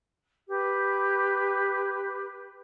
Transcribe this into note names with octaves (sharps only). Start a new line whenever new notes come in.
G4 B4